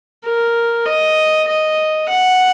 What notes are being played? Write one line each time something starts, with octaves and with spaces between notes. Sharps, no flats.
A#4
D#5
D#5
F#5